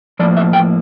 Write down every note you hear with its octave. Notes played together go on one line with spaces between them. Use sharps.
A2 F3 A#3 D5
E5
G5